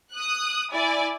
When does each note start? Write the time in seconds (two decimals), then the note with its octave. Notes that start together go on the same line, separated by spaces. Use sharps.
0.12 D#6 F#6
0.72 E4 D5 G#5